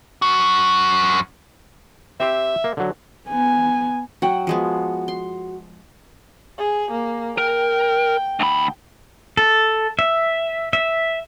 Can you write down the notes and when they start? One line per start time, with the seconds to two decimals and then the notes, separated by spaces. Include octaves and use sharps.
0.22 F#2 F#4
2.20 C4 G4 C5 E5
2.64 A#3
2.77 D3 F#3
3.28 B3 G#5
4.22 F#3 F#4 F#5 G5
4.47 F3 G#3 B3
5.08 C6
6.58 G#4
6.91 A#3
7.38 A#4 G5
8.40 D2 B5
9.37 A4
9.99 E5
10.73 E5